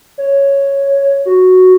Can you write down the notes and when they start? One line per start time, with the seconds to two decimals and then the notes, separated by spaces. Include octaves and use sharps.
0.18 C#5
1.25 F#4